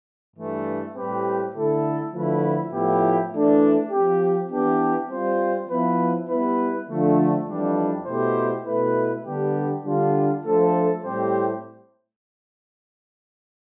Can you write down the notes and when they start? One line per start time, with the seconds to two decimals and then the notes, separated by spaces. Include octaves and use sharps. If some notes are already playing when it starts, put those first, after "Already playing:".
0.35 G2 E3 A3
0.94 A2 G3 C4 G4 B4
1.54 D3 A3 E4 A4
2.13 D3 F3 A3 E4 B4
2.72 A2 F3 B3 E4 G4
3.31 E3 A3 D4
3.91 F3 C4 G4
4.50 E3 B3 D4 G4
5.09 G3 C4 F4 C5
5.68 F3 B3 E4 B4
6.28 G3 B3 E4 B4
6.87 D3 F3 A3 D4
7.46 F2 E3 G3 D4
8.05 B2 A3 E4 G4 C5
8.65 B2 A3 E4 B4
9.24 D3 G3 B3 D4 G4
9.83 D3 G3 D4 F4
10.43 F3 A3 D4 A4 C5
11.02 A2 G3 C4 G4 C5